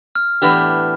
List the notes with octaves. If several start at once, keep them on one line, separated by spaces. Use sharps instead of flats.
F6
A2 E3 B3 D4 G4 F6